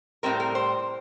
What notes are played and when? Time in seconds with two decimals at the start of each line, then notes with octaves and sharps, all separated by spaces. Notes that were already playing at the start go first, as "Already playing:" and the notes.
0.23 A2 G3 C4 A#4
0.40 A#4
0.55 C5